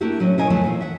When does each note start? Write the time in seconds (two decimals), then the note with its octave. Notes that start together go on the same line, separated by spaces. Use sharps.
0.01 A3 A#3 D4 E4 F#4 G4
0.20 A2 F#3 G3 C#4 D4
0.38 B2 C#4 E4 A#4 D#5 G#5
0.50 D2 F3 F#3 A3 B3 A4
0.64 A#2 E3 D#4 F4
0.81 E5 F#5